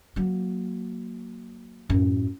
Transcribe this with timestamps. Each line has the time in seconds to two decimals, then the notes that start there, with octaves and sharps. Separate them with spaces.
0.16 F#3 A#3
1.90 F#2 A2